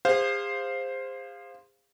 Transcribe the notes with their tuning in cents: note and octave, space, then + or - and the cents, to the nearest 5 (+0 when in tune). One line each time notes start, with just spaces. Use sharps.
G#4 -40 C5 +0 F5 +0